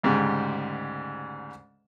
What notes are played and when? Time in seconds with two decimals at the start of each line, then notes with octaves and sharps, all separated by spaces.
0.03 D2 G#2 C#3 G3